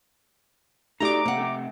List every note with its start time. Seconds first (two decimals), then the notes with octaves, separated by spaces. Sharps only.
1.00 A3 D#4 F#4 G4 D5 A#5 D6
1.25 C3 A#3 F#5
1.37 A3 C4